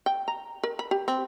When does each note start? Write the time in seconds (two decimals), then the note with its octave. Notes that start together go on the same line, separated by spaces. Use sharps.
0.06 G5
0.28 A#5
0.63 A#4
0.79 B5
0.91 G4
1.08 C4